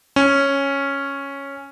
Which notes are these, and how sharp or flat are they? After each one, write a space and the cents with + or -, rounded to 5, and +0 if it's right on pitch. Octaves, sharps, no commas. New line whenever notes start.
C#4 -5